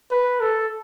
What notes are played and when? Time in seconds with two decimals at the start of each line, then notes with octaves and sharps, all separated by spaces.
0.11 B4
0.41 A4